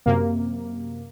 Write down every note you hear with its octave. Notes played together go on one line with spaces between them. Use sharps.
F#2 C3 A#3